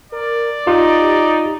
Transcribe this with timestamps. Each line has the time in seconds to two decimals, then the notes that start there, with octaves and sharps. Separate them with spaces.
0.12 A#4 D5
0.67 D#4 F4 G4